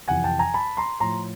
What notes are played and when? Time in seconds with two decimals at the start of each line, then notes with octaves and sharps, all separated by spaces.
0.08 F2 C3 E3 F#5 G#5
0.24 G5 A5
0.39 G#5 A#5
0.54 A5 B5
0.77 A#5 C6
1.00 A2 F3 A#5 C6